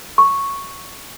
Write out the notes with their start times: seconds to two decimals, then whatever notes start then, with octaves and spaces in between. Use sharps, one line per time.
0.18 C#6